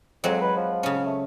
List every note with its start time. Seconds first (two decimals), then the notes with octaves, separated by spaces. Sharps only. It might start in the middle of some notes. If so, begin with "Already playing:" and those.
0.24 F2 F#3 G#3 C4
0.41 B4
0.57 F3
0.83 C#3 C#4
1.06 A3